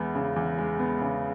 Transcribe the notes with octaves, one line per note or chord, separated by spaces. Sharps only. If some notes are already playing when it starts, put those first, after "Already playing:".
Already playing: E2 G#3 B3
C#3
E2
G#3
B3
C#3